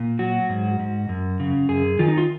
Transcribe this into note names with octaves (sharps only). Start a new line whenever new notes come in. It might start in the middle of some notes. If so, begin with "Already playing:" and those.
Already playing: A#2
F#3 F#4
G#2
G#2
F#2
C#3
F#2 G#4
D#3 F4
D#4
F4